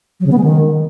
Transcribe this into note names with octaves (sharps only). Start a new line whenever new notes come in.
F#3
C#3
B3
G#3
D#3